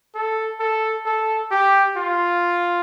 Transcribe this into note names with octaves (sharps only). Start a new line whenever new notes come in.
A4
A4
A4
G4
F4